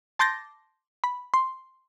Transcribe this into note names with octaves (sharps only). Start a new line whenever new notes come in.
A5 C6 D6 G6 A6 A#6
B5
C6